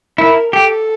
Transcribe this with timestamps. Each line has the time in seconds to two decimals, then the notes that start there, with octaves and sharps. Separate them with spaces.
0.18 E4 A#4
0.53 G4 A4